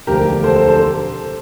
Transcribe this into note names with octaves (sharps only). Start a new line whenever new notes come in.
E1 D2 D3 F3 G4 A#4
A4 C5
A4 C5
A4 C5